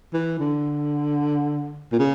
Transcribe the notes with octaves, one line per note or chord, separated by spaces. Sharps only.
E3
D3
A#2
C#3